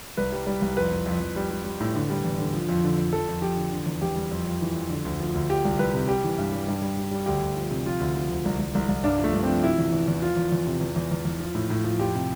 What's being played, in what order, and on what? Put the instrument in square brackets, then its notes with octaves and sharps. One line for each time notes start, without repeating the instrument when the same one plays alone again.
[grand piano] C2 B4
G3
G3
C2
F2 B4
F2
F2
F2
G3
G3
G3
A2
D3
G3
E2
D3
F3
F2
D3
F2
F2 A4
F2
F3 G4
D3
D3
E2
E2 G4
G3
F2
F2
E3
F2
D3
D2
F3
D2
F3 G4
C2
C2 B4
C3
G3 G4
E3
G2
G3
G2
G3
G3
G3
D2 G4
D2
F3
C3
F3 F4
D2
F3
D2
C2
C2
C2
C2
G2 D4
F3
A3
G2
C4
F3
C3 E4
E2
E2
E2
F3 F4
E2
E2
C3
E2
E2
E2
E2
F3
A2
A2
F3
F2 G4
C3